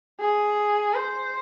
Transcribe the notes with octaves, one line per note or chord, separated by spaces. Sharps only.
G#4
C5